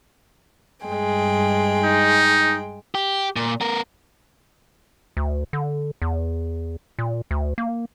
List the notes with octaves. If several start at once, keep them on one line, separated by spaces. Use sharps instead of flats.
G2 G#3 G5
D#4
G4
A#2
B3 A#4
D2
D3
E2
A#2
D2
A#3